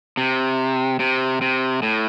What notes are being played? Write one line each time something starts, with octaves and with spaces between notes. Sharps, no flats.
C3
C3
C3
A2